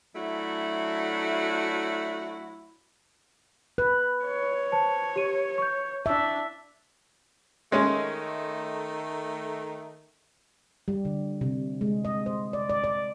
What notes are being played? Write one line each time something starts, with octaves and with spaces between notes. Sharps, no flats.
F#3 A3 D4 E4 F#4
B4 F#6
C#5
C5 A5
G4 D#7
C#6 G6
D4 E5
D#3 G#3 A3 C#4
G3
D3
C3
G#3
D#5
C5
D5
D5
D5